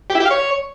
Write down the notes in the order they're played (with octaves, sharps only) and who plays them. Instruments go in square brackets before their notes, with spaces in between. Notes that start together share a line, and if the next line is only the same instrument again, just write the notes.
[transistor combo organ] G4
E4
G4
F5
C#5